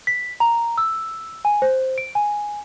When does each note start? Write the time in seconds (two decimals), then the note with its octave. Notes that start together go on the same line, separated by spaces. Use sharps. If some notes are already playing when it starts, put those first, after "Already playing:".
0.07 B6
0.40 A#5
0.78 E6
1.45 G#5
1.62 C5
1.98 D7
2.15 G#5